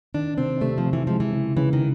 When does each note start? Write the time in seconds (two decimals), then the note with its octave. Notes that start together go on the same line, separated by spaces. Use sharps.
0.14 D#3 D4
0.38 C3 C4
0.61 C3 A3
0.78 F3
0.86 C3
0.93 E3
1.07 F3 G#3
1.20 E3
1.33 C#3
1.57 C#3 E3
1.73 D#3